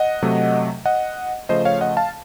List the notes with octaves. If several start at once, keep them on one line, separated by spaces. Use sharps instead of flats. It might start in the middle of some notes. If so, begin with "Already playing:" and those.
Already playing: D#5 F#5
C3 F#3 A3
D#5 F#5
C#3 F3 A3 C5 D#5
C#5 F5
D#5 F#5
F5 A5